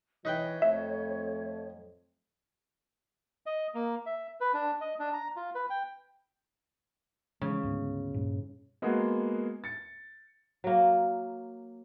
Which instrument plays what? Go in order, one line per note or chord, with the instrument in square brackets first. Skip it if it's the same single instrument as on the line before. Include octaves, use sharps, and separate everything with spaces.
[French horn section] E3 [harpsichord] D#4 B4 G5 [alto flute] C#5
[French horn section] F2 A3 [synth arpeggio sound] E5
[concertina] D#5
A#3
E5
B4
D4
D#5
D4
A#5
F4
B4
G5
[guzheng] C#3 [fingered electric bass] E3 F3 G#3
[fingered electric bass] D2 G#2 B3
G2 A#2
[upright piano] G#3 A#3 B3 F#4 G#4
A6 C#7
[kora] F#3 A#3